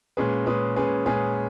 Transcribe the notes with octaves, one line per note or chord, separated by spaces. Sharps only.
A#2 G#3 C#4 G#4 B4
A#2 G#3 C#4 G#4 B4
A#2 G#3 C#4 G#4 B4
A#2 G#3 C#4 G#4 B4